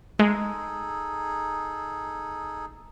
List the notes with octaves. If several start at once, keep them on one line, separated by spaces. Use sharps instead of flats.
G#3 D#4 G#4 A4